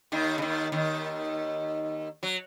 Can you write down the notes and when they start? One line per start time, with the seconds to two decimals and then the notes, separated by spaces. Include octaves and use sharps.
0.12 D#2 D#3
0.38 C#3
0.42 D#2 D#3
0.72 D#2 D#3
2.23 F#3